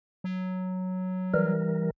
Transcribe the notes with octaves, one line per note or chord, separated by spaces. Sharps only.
F#3
E3 G3 A#4